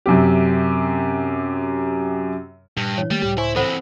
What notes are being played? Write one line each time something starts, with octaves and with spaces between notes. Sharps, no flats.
F#2 C3 G4
G2 A#2 A#6
E3 C#5
D#3 G3 A3 A#3 A6
C#2 A2 G4
E4 C5 G#5 C#6
E3 C4 A4 C5 F#5 B5